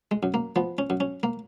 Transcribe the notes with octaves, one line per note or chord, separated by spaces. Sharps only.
G#3
F#2
A#3
F3 B3
C#4
F#2
C#4
A#3